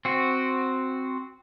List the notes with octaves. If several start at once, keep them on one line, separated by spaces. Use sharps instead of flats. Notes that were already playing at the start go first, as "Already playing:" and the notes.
C4 F#4